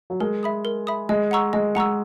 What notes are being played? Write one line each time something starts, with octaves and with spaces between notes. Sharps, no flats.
F#3
G#3 A#4
E5 B5 D#6
A#4
E5 B5 D#6
G#3 D#5
F#5 A#5 C#6 E6
G#3 D#5
G#3 F#5 A#5 C#6 E6